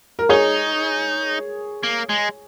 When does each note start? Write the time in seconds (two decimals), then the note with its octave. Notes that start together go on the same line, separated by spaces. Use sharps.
0.19 A#4
0.29 D#4 G#4 C#5
1.83 A#3
2.09 G#3